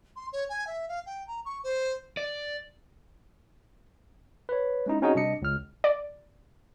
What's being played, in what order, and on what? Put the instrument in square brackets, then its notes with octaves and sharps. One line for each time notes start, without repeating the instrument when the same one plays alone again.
[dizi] C6
C#5
G#5
E5
F5
G5
A#5
C#6
C5
[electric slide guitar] D5
[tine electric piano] B4 C#5
G#3 C#4 D#4 E4
C4 C#4 D#4 F#4 G#4 D#5
C3 G3 D4 D#5 C#7
C#2 F6
[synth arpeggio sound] D5